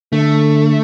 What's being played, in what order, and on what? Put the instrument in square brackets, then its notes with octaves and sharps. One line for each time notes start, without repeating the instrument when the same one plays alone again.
[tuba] D3 [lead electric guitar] A3